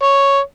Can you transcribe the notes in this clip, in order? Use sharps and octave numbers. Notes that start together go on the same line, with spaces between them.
C#5